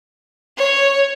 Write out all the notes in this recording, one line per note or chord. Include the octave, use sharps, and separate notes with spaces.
C#5